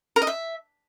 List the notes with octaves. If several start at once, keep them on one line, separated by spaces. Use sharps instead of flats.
A#4
D#5
E5